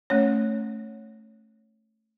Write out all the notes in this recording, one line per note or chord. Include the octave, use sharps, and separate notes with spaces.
A3 C#4 C#5